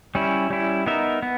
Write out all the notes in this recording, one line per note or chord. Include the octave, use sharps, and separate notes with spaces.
G3 C#4 E4
G3 C#4 E4
B3 D#4 A#4 E5
B3